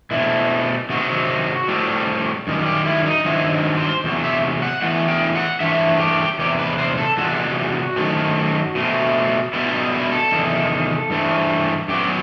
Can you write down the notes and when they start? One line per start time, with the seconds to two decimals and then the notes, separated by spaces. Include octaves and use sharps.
0.11 B2 A3 C4 E4
0.90 C3 D#3 F#3 C4 F#4
1.68 A2 G3 C4
2.47 F#2 D#3 G3
2.66 G4
2.85 E4
3.06 D#4
3.25 G2 D#3 F#3 C4 E4
3.77 C5
4.04 E2 C3 F#3
4.24 E5
4.62 F#5
4.82 A2 E3 B3 F#5
5.08 G5
5.35 F#5
5.60 G2 E3 A3 C4 E5
6.00 G4
6.39 E2 C3 G4
6.59 B4
6.78 C5
6.98 A4
7.17 E2 C3 G3 F#4
7.96 F#2 D#3 A3 C4
8.75 B2 A3 C4
9.53 B2 G3 B3 E4
9.64 E4
9.73 D#4
9.93 E4
10.12 A4
10.32 E2 C3 D#3
11.10 G2 E3 A3 C4
11.88 F#2 F#3 B3 G4